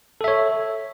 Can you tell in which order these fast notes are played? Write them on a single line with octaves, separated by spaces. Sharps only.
A4 E5 C#5